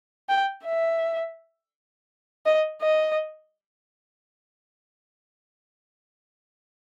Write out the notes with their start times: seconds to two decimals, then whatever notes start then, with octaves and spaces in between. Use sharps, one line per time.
0.29 G5
0.64 E5
2.46 D#5
2.82 D#5